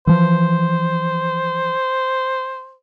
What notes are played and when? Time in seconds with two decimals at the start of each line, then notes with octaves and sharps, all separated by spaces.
0.07 E3 F3 C5